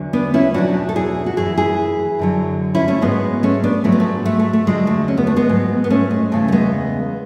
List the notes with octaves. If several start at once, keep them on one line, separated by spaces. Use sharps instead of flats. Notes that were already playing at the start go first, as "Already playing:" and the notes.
Already playing: E2 D3 F#3
B3 D4
C#4 E4
E2 B2 F#3 D4 F#4
A4
E4 G#4
F#4
F#2 E3 E4 G#4
E4 G#4
F#2 D3 F#3
C#4 E4
A3 C#4
G#2 F#3 G#3 B3
A3 C#4
B3 D4
G#2 F#3 A3
B3
A3
A3
A3
A3
E2 D3 F#3 G#3
A3
C#4
B3
A3
G#3 B3
G#2 F#3
B3
A3 C#4
G#3
E2 C#3 E3 A3
A3
G#3 B3